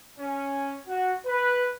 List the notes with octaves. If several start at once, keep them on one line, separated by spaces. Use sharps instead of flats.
C#4
F#4
B4